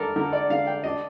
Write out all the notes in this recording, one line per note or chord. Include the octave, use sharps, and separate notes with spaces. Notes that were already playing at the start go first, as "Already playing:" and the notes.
Already playing: D4 A4 A#4
D3 A#4
D5
D3 F5
G5
D4 D#5